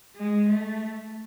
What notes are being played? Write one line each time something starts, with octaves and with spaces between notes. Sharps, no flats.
G#3
A3